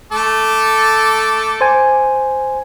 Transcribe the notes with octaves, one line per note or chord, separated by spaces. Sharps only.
A3 A4 D6
C5 G#5